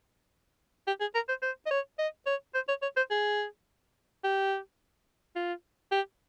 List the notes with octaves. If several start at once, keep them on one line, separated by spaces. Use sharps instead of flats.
G4
G#4
A#4
C5
C5
D#5
C#5
D#5
C#5
C5
C#5
C#5
C5
G#4
G4
F4
G4